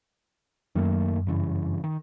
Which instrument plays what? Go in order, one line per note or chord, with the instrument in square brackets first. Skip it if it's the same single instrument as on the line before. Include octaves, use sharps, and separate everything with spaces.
[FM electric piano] F#2 [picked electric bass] D#3 A3 A#3
[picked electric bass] G2 C#3 E3
D#3